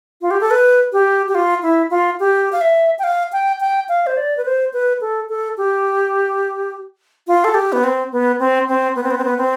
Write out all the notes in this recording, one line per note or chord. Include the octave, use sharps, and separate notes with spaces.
F4
G4
A4
B4
G4
G4
F4
E4
F4
G4
F5
E5
G5
F5
G5
G5
F5
C5
D5
B4
C5
B4
A4
A4
G4
F4
A4
G4
B3
C4
B3
C4
C4
B3
C4
B3
C4
B3
C4